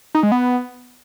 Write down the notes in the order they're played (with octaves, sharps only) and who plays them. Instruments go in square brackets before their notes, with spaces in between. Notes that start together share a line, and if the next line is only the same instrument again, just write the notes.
[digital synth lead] D#4
G#3
B3